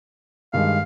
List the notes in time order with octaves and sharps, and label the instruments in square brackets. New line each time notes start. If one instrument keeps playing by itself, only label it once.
[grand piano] G2 D#3 G#3 [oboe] F5